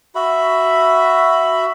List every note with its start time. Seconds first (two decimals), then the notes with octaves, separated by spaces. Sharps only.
0.15 F#4 E5 B5